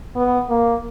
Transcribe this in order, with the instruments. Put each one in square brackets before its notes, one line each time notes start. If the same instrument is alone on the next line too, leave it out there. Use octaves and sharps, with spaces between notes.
[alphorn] B3
A#3